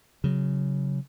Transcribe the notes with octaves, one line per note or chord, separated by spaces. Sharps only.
C#3 F#3